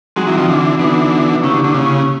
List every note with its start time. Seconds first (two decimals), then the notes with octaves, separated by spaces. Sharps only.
0.16 F#3 G#3 C4 D#4 F#4
0.27 E3 F#3
0.37 D#3 F3
0.48 D3 E3
0.79 D3 E3 B3 D#4 F#4 B4
1.42 C#3 A#3 C#4 E4 G4
1.53 D3
1.64 D3
1.74 C#3